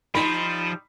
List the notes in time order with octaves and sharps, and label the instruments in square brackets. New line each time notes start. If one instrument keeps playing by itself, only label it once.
[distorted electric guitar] F3 C5 [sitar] G3 D#4 [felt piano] B5